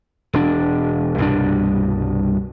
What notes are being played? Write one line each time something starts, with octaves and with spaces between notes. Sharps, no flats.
E1 D4
C2 G2 B2 D4